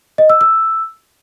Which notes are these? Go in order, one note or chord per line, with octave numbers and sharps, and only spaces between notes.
D#5
E6
E6